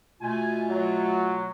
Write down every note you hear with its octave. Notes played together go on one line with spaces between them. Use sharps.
B2 A3 F4 G#5
F#3